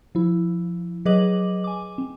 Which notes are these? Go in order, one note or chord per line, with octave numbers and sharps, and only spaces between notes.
F3 E4
F#3 G#4 B4 D#5 D6 F#7
G#5 D6
C4